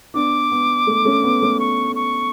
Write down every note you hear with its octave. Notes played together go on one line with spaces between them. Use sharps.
B3 D4 D6
B3
A3
A3 C#4
B3
A3 C#4
C#6
C#6